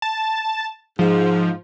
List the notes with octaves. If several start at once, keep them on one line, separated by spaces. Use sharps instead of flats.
A5
G#2 F3